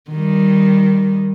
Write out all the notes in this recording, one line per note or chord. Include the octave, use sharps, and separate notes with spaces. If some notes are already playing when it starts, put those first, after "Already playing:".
D#3 G3